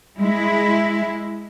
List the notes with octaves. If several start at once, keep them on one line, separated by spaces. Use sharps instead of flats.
G#3 E4